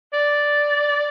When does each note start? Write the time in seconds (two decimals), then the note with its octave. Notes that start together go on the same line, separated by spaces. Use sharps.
0.13 D5